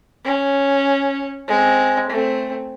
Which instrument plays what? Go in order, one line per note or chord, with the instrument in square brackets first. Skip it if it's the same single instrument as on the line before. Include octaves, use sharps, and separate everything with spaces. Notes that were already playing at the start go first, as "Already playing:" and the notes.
[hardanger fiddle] C#4
G#3 C4
A3 C4